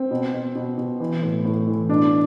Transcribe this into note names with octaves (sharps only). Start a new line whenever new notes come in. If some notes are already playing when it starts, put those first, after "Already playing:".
Already playing: C4
B2
B2
B2
B2
E3
A2
A2
E3
B2 D4